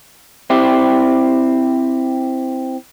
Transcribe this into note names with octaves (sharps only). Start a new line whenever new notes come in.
C4 E4 G4